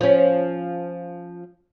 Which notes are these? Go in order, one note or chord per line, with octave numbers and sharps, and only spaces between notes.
F3 C#4